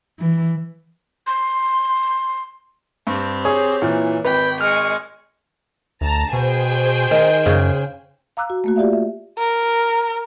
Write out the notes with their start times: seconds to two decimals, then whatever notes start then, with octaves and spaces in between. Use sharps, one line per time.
0.19 E3
1.27 C6
3.07 G2 C4 G4
3.45 G#4 C#5
3.82 A#2 E3
4.25 G#1 B4 G5 B5
4.61 G#3 C#6 F6
6.01 D2 A5 A#5
6.33 B2 G#4 C5 G5
7.11 D#3
7.46 F#2 C#3
8.37 F5 A#5 D6 E6 F#6
8.50 F#4
8.64 A3 A#3 F#4
8.76 F4 G4 D5 E5 F5
8.93 E5
9.38 A#4